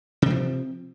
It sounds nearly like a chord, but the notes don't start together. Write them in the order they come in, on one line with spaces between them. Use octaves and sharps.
C3 C4 F3